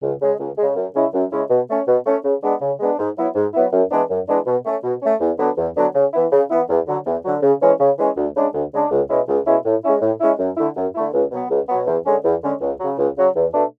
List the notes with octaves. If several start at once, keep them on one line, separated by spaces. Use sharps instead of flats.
C#2
C#3 G#3
C#2
C#3 G#3
F#2
C#3 G#3 C#4 E4
F#2
C#3 G#3 C#4 E4
B2
A3 C#4
B2
A3 C#4
C#3
G#3 B3 D4
C#3
G#3 B3 D4
G#2
F#3 B3 E4
G#2
F#3 B3 E4
F#2
E3 G#3 B3 D4
F#2
E3 G#3 B3 D4
B2
A3 C#4
B2
A3 C#4
E2
D3 F#3 B3 D4
E2
D3 F#3 B3 D4
C#3
E3 B3 E4
C#3
E3 B3 E4
E2
D3 F#3
E2
D3 F#3
C#3
E3 G#3 C#4
C#3
E3 G#3 C#4
D2
C#3 G#3 D4
D2
C#3 G#3 D4
C#2
B2 G#3 C#4 E4
C#2
B2 G#3 C#4 E4
A2
G#3 C#4 E4
A2
G#3 C#4 E4
F#2
D3 A3 E4
F#2
D3 A3 E4
C#2
B2 F#3 B3
C#2
B2 F#3 B3
E2
D3 G#3 C#4
E2
D3 G#3 C#4
C#2
C#3 F#3
C#2
C#3 F#3
E2
B2 A3 D4